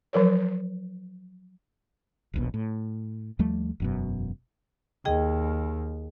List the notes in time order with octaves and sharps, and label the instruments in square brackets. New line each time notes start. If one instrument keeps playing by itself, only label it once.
[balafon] F3 F#3 A#4 C#5
[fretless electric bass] D#1 A#1 B2
A2
D#2 F3 G3 A3
E1 F#2 B2
[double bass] D#2 [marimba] G#4 D#5 G5